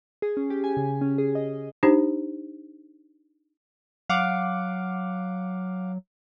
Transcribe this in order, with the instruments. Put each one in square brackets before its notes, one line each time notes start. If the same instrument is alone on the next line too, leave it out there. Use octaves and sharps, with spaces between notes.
[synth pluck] G#4
C#4
G4
G#5
C#3
C#4
G#4
D#5
[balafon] D4 D#4 G4 C5
[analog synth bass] F#3 [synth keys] F5 F#5 D6